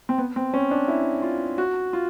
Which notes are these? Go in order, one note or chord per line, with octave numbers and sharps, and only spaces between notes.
C4
B3
C4
C#4
D4
E4
F4
F#4
F4